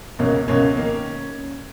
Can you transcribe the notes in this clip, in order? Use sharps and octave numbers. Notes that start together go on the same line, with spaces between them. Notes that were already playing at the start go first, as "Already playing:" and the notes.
C#2 B2 A#3 C#4
C#2 B2 A#3 C#4
D#3 A#3